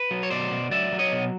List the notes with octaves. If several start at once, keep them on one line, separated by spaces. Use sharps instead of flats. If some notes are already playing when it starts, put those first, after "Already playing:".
Already playing: B4
F#3
C#5
B2 C5 D5
B2
F#3 D5 E5
F#3
C#5 D#5
B2